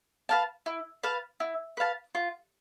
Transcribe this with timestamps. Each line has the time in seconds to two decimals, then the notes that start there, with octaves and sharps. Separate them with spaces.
0.29 B4 F5 A5
0.66 E4
1.03 B4 F5 A5
1.40 E4
1.77 B4 F5 A5
2.15 F4